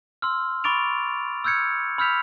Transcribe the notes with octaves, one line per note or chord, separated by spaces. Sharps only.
C6 E6 F6
B5 C#6 D6 A6 D7 F7
E6 F6 G6 G#6 C#7
B5 E6 F6 G6 B6 F7